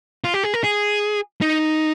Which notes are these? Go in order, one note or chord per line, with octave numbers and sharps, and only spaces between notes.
F4
G4
G#4
A#4
G#4
D#4